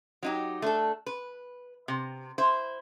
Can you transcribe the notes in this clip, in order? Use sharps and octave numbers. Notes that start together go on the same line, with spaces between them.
F#3 D#4 G4
A3 D4 A4
B4
C3
E4 C5